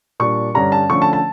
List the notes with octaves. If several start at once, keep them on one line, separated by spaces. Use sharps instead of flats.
A#2 G3 D4 C#6
G2 D3 G3 C#4 A#5
A5
D3 F3 A3 C#4 C#6
A5
A5